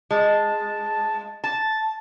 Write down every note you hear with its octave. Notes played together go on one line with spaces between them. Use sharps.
G#3 A5
A5 A6